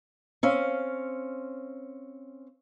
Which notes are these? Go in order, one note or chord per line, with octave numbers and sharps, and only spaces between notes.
C4 C#4 F5